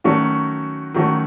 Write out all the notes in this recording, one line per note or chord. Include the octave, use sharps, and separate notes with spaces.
D#3 F#3 A3 C#4 F#4
D#3 F#3 A3 C#4 F#4